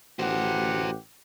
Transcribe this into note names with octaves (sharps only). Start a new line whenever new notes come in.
A1 F#4 G4 C5 F#5